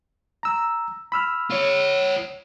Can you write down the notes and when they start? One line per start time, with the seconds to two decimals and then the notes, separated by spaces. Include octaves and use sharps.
0.43 A#5 E6
1.12 B5 E6 F6
1.51 F4 C#5